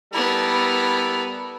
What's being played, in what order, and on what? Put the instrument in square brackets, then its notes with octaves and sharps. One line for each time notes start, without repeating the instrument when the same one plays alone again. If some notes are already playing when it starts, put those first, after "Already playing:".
[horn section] G3 E4 A4 [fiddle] B3 A#4